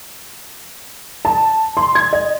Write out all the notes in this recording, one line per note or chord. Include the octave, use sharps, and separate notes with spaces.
A5
C6
G#6
D#5